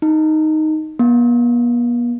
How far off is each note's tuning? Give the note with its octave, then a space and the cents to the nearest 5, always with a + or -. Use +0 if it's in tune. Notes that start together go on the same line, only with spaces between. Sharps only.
D#4 +0
B3 -45